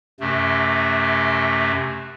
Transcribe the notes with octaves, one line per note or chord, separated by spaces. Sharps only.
F#2 C3 A3